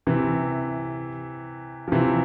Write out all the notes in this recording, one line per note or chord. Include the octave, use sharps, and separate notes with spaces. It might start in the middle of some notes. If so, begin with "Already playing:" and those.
C3 E3
F3
C3 E3